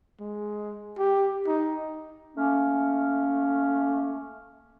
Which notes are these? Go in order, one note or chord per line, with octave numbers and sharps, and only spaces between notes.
G#3
G4
D#4
A3 A#3 C#4